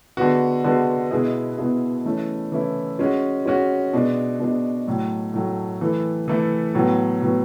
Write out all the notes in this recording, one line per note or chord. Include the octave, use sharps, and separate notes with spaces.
D3 G#3 B3 F#4
D3 G#3 B3 F#4
B2 G#3 B3 E4 G#4
B2 G#3 B3 E4 G#4
E3 A3 C#4 E4
E3 A3 C#4 E4
G#3 C#4 F#4
G#3 C#4 F#4
B2 G#3 D4
B2 G#3 D4
A2 F#3 A3
A2 F#3 A3
E3 A3 E4 A4
E3 A3 E4 A4
A2 F#3 B3
A2 F#3 B3